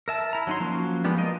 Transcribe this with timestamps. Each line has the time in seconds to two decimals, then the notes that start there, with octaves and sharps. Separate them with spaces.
0.08 A#4 E5 A5
0.33 E4 A#5
0.47 F#3 D#4 C6
0.60 F3 F#3 A#3 C#4
1.04 G#3 B3 D4 F4 G4
1.18 F4 A#4 D#5